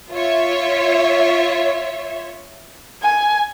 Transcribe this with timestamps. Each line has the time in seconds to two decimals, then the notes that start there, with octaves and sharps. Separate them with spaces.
0.12 F4 C#5 E5
3.02 G#5